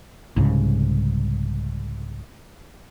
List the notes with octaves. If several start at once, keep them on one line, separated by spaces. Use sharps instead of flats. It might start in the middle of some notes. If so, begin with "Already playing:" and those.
C2 G#2 C#3